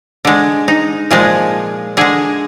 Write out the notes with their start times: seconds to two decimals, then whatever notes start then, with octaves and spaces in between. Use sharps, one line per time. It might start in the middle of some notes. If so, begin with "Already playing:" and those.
0.25 D3 G#3
0.68 D#4
1.11 A#2 F3 G#3 G#4
1.97 D3 G#3 G#4